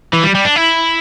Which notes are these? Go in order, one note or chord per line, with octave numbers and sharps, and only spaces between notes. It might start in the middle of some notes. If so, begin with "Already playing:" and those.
E3
G3
G3
D4
E4